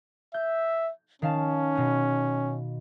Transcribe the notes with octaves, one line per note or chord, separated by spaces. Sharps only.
E5 G6
D#3 C#4 F5 A5
B2 B3